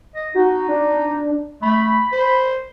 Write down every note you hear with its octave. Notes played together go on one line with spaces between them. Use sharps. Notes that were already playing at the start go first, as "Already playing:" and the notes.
D#5
D#4 F#4
D4
A3 B5
C5